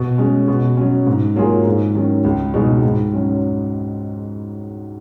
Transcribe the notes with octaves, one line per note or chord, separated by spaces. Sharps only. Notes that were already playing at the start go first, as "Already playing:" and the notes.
Already playing: B2
G#3 C#4
B2
F#3 C#4
G#2
F#3 A#3 F4 G#4
G#2
D#3 F#3 C#4
C#2
B2 G#3 D#4
G#2
F#3 C#4